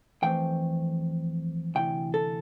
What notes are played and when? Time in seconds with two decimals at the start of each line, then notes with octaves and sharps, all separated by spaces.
0.22 F2 E3 A3 C4 G5
1.75 D2 C3 E3 G5
2.14 A4